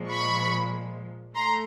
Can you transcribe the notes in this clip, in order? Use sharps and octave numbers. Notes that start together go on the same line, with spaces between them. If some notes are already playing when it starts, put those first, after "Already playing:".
Already playing: A#2 F3 G#3
B5 C#6
A3 A#5 C6